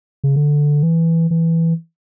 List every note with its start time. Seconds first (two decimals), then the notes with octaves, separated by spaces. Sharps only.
0.24 C#3
0.36 D3
0.83 E3
1.31 E3